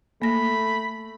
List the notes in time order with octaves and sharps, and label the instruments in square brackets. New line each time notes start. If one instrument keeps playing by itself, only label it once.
[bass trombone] A3 [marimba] A#3 A#6 [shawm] B5